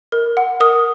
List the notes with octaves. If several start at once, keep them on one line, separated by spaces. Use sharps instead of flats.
A#4
F#5
A#4 D#6